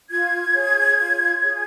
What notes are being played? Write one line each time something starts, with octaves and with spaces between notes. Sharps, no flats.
F4 G#6
G#4 C#5
F4
G#4 C#5